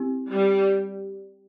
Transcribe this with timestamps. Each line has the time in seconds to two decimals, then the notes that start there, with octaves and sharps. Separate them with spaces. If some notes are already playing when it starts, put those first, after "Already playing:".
Already playing: C4 E4 G4
0.31 G3